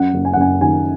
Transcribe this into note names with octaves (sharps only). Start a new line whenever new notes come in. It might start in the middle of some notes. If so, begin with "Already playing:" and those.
Already playing: F#2 F#5
F#1
G#5
F#5
F#1 G#5
D#3 G#5